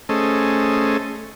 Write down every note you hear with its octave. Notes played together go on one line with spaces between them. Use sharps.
A3 C#4 G#4 A4 C5 D#5